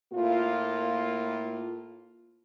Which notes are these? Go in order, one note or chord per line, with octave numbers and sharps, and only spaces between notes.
A2 A#3 F4